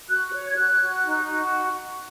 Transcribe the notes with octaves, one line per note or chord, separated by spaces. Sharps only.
F#4 F#6
C#5
G#6
F#4 F#6
F#4
D#4
F#4